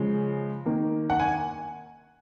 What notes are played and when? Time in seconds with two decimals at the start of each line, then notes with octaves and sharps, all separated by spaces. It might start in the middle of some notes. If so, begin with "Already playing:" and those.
Already playing: C#3 F3 G#3
0.66 D#3 A#3
1.10 F#5
1.20 G#5